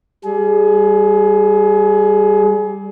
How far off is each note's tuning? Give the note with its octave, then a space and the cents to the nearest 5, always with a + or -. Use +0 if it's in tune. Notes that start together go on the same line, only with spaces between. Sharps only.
G3 +0 G#4 +30